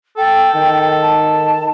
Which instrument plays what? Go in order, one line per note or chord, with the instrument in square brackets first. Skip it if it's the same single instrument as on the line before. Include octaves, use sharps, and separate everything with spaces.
[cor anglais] A4 [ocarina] G5
[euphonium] D#3
[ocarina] A5